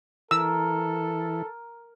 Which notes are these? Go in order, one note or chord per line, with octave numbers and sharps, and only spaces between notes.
E3 A4 A#4 E6